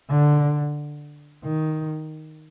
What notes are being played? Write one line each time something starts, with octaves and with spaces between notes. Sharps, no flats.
D3
D#3